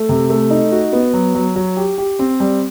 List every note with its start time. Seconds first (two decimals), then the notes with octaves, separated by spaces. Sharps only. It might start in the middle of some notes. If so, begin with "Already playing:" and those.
Already playing: A3
0.09 C3
0.30 A3
0.51 D#4
0.72 F#4
0.93 B3
1.14 F#3
1.35 F#3
1.56 F#3
1.77 G4
1.98 G4
2.19 C4
2.40 G3